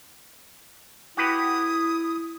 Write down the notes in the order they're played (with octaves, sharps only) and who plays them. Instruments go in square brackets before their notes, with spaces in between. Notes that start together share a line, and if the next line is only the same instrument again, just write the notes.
[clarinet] E4 [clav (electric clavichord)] F#4 G4 B4 [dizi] D#6